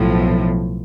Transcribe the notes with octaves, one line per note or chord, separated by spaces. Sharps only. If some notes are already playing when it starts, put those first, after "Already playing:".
Already playing: B1 A2 F3